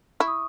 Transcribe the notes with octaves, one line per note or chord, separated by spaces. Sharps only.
E4 C#6
D#6